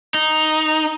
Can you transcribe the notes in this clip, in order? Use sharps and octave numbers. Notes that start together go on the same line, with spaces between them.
D#4